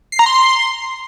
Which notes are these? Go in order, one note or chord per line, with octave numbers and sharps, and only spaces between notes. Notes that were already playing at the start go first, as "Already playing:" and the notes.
C7
A#5
C6